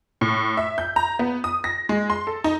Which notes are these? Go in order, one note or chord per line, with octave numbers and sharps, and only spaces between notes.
A2
E5
G6
A#5
B3
D#6
A#6
G#3
C6
A4
D#4